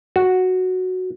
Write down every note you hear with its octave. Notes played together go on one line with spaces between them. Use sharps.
F#4